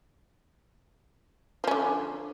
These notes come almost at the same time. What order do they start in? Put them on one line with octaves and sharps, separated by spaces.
F3 C#4 D3